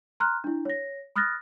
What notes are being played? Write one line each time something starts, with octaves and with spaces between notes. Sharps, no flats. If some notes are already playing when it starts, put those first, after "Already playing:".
A#5 C6 F6 F#6
D4 E4
C#5 A#6
B5 D#6 F6 F#6 A6 A#6